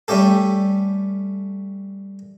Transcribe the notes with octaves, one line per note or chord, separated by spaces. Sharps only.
G3 A3 C#4 G4 A4